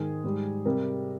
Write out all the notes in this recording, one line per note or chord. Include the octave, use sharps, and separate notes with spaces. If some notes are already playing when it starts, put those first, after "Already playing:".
Already playing: G#2 D#3 G#3 G#4
G#2 G3
C3 G3 A#4